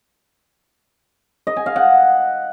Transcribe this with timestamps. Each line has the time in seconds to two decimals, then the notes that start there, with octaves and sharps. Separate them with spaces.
1.47 D#5
1.56 G#5
1.66 F5
1.76 F#5